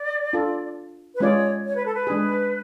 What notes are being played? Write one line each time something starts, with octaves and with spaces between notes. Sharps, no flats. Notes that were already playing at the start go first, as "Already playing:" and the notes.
Already playing: D5
D4 F4 A4
B4
G#3 C#4 F4 G#4 C#5 D5
C#5
B4
A4
B4
G#3 D4 G#4